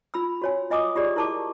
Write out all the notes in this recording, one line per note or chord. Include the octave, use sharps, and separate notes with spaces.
F4 B5 E6
F#4 C#5 G#5
F4 D#5 G#5 D6 D#6
F4 G4 G#4 D5
E4 A#4 A5 C#6 D6